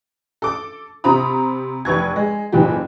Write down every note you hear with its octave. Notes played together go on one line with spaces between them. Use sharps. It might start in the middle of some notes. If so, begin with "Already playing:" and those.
A4 D6
C3 C5 A#5 B5 D#6
F1 B4 C#6 G#6
G#3
F#1 A#2 E3 G4